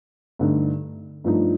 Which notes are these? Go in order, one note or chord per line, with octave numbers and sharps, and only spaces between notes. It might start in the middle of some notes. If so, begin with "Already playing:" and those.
G2 D3 A3 D#4
G2 F3 A3 D#4